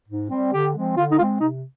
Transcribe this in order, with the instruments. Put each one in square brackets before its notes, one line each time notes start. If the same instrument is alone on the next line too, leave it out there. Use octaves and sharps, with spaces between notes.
[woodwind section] G#2
G3 C4
D3 G4
F3 G#3 C4
D3 F4
D#4
G#3 C4 F4
C3 D#4